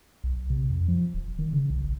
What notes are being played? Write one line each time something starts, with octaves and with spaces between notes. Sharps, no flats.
B1
C3
F2
F3
D#1
D#3
C#3
B1
A1